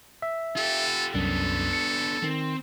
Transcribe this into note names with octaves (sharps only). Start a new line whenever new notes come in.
E5
F4 G4 A4
C2 F#2 B3 D4 A4
C#7
D#3 C4